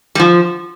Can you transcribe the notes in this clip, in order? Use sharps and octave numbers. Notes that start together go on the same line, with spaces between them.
G3
F3